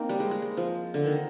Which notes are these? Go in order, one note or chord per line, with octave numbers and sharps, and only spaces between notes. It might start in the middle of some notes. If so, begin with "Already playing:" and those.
Already playing: A#3 C4 D#4
G3
G#3
G#3
G#3
F3
D3
D#3